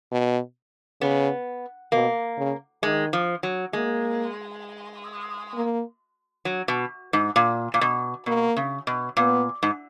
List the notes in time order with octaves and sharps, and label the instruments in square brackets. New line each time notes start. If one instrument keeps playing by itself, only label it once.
[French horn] B2
[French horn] C#3 [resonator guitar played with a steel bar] B3
[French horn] B2 [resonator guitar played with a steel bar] A#3
[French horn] C#3
[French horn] D#3 [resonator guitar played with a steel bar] G#3
[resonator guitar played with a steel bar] F3
F#3
[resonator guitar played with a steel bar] G#3 [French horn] A#3
[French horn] A#3
[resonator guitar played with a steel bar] F#3
B2
G#2
A#2
A#2
B2
[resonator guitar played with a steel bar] B2 [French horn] A#3
[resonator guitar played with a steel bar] C#3
B2
[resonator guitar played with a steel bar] A#2 [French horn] B3
[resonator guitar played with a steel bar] G#2